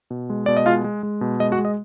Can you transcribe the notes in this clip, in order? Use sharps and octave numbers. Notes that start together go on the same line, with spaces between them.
B2
G#3
B2 D5
D#5
G#3 F4 F5
G#3
G#3
B2
G#3 D#5
F#4 F#5
G#3
D#5